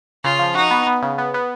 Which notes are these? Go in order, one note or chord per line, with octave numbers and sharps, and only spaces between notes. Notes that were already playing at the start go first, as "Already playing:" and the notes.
C#3 F4
F3
D#4 F#4
B3
B3
C#3
B3
B3